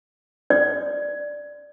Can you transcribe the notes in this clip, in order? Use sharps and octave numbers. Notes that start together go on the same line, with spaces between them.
D5